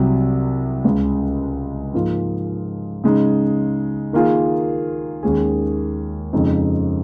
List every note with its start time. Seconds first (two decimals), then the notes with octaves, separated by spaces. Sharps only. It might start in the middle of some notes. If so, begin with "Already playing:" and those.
Already playing: C2 C3 F#3
0.85 C#2 C#3 G#3
1.94 G#2 F3 A#3
3.04 C#3 G#3 D#4
4.13 D#3 A#3 F4 G#4
5.23 D#2 D#3 G#3 C#4 G#4
6.33 F2 C#3 G#3 C4 D#4